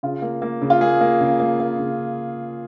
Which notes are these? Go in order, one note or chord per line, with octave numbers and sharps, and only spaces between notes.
C#3 F4
A#3
A#3
C#3
F4
A#3 G#4
A#3
C#3
A#3
A#3
C#3